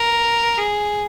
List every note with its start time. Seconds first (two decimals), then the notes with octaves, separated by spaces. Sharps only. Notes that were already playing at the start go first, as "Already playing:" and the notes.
Already playing: A#4
0.57 G#4